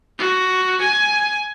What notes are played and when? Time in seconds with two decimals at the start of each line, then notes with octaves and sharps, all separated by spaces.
0.18 F#4
0.81 G#5